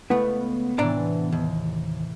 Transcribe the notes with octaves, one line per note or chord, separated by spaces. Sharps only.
C#2 A3 B3 E4
A2 C3 E3 D4 D5 A#5
D#2